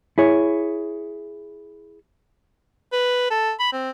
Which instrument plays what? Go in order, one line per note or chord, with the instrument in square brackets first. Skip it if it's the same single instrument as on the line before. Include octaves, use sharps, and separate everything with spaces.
[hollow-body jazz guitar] E4 G#4 C#5
[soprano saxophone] B4
A4
B5
C4